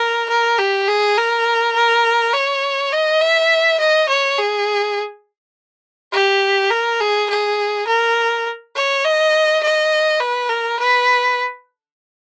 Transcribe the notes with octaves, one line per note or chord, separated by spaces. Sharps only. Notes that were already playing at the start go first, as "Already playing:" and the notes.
Already playing: A#4
A#4
G4
G#4
A#4
A#4
C#5
D#5
E5
D#5
C#5
G#4
G4
A#4
G#4
G#4
A#4
C#5
D#5
D#5
B4
A#4
B4